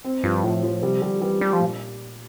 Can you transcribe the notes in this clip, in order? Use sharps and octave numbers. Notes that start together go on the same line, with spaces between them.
C4
G2 F3
A2 F3
F3
C3 G3
D3 G3
E3 G3
G3 D4
F3
A#2